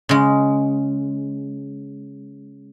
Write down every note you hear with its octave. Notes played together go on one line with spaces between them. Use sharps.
C#3 G#3